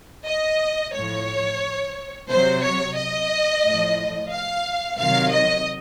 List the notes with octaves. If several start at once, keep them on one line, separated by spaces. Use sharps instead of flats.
D#5
A2 F3 C#5
C3 F#3 C5
C#5
D#5
A2 F3
F5
C3 D#3 F#3 F5
D#5